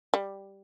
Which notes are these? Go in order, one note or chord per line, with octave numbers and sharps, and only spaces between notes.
G3